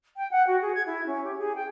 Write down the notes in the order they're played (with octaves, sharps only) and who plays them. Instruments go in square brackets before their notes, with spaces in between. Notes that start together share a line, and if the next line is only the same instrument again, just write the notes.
[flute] G5
F#5
F#4
G#4
G#6
E4
C#4
G4
G#4
G5